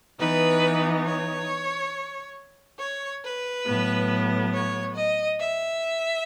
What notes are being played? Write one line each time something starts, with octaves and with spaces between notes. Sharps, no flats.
E3 B3 D#4 B4
C#5
C#5
B4
A2 F#3 B3
C#5
D#5
E5